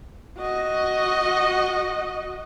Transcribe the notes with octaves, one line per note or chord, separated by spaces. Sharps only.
F#4 D#5